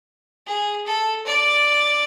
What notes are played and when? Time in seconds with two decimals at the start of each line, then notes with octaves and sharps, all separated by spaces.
0.46 G#4
0.86 A4
1.26 D5